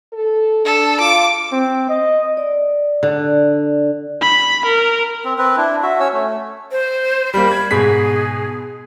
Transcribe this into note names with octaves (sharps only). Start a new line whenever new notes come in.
A4
D4 A4
F4 D6
C4
D#5
D5
D3
B5
A#4
C4
C4 B4
D4 E4
F#4 E5
C#4 C#5 E6
A3
C5
G3 A#3 B5
G#6
G#2 B2 G#4 B6